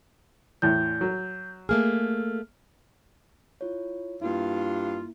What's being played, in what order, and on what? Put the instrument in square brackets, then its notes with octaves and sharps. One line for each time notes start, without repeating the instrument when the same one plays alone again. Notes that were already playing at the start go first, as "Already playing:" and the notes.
[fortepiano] E2 A2 [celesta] G6
[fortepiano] F#3
[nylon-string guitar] A3 A#3 G#4 [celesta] F6
[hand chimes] E4 F4 C#5
[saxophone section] G2 F4 [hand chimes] A#3 E4